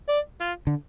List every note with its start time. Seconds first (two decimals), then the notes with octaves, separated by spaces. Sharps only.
0.09 D5
0.41 F4
0.67 D3